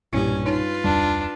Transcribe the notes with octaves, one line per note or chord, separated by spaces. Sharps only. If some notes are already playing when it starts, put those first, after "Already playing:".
B1 G2 A#2 C#4 E4 G4
D#4 F4 B4 C#5 A5
D1 F2 G3 D4